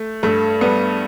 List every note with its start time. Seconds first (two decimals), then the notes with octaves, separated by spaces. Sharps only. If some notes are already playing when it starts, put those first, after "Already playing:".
Already playing: A3
0.23 G2 A3
0.61 G3 B3